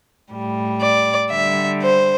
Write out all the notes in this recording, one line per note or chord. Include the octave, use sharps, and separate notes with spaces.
A2 G3
D5
D3 G3 E5
C5